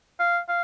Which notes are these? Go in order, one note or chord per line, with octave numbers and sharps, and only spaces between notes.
F5
F5